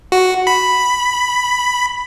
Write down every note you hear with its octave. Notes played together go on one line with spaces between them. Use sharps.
F#4
B5